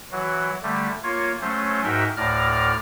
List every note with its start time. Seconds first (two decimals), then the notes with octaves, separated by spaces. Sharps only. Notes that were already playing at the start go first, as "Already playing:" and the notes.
0.12 E3 F#3 F#4
0.63 D3 G3 A3
1.03 A#3 F4 C#5
1.41 F#3 A3 C#4 C5
1.84 G#2 D#4 F#4 A#4 E5 G5
2.17 D2 A2 D5 A#5 F6